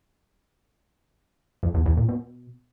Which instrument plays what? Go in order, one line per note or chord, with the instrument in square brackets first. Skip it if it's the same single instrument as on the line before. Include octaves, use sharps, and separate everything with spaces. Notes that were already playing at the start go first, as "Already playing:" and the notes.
[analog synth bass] F2
E2
E2
A#2
B2